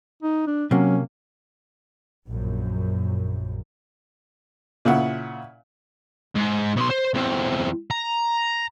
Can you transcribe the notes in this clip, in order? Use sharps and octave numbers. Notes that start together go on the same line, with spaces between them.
D#4
D4
C3 F#3 A#3 C#4
A#1 F#2
A#2 C#3 E4 F#5
G#2
B2 C6
C5
E2 C4
A#5